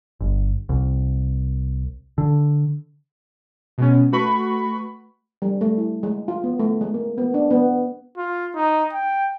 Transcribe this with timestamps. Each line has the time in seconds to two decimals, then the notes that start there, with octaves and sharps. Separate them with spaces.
0.21 G1
0.69 C2
2.18 D3
3.78 B2 G#3 B3 C#4
4.12 A3 F#4 B4 B5 C#6
5.42 G3
5.61 A3
5.78 E4
6.03 G#3
6.28 F4
6.44 B3
6.59 A3
6.81 G#3
6.94 A#3
7.18 B3
7.34 D4
7.51 B3
8.17 F4
8.55 D#4
8.93 G5